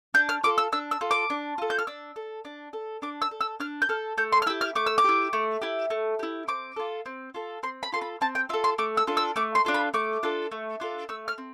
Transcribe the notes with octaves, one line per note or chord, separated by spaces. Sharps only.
D4 G6
F6
F4 A4 D6
E6
D4 E6
E6
F4 A4
D6
D4
F4 A4
G6
F6
D4 E6
A4
D4
A4
D4 D6
E6
A4
E6
D4 F6
G6
A4 F6
A3 G6
C6
F6
E4 G4 E6
F6
A3 D6
E6
D6
E4 G4
A3
E4 G4
A3
E4 G4
C4 D6
F4 A4
C4
F4 A4
C4 C6
B5
F4 A4 C6
B5
C4 A5
G5
F4 A4 E5
C6
A3 D6
E6
D4 F4 A4
E6
A3 D6
C6
D4 F4 A4
B5
A3 D6
D4 F4 A4
A3
D4 F4 A4
A3 E6
F6
C4